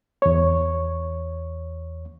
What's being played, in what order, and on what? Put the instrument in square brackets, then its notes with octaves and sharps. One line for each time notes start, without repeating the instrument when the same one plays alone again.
[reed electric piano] E2 C#5